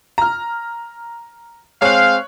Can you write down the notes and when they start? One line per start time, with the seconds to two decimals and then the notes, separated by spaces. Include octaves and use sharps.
0.18 A#5 F6
1.82 G#3 C4 C#5 F5 F#6